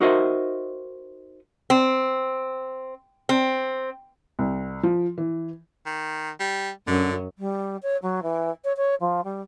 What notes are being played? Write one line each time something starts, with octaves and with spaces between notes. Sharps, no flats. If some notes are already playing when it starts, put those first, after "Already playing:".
D#4 F#4 A#4 C5 D#5 E5
C4
C4
C2
F3
E3
D#3
G3
F#2 D3
G3
C#5
F#3
E3
C#5
C#5
F3
G3